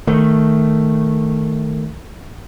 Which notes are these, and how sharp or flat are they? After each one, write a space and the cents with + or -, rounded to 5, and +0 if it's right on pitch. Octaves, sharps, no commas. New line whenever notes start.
D#3 +0 A3 +0